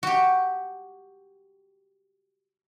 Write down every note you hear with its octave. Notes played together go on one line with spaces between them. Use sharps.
F#4 G4